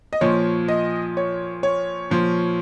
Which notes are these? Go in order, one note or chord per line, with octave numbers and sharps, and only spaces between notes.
D#5
A#2 F3 C#5
D#5
C#5
C#5
A#2 F3